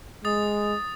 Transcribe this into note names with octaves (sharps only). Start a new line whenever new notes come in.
G#3 D#6 A6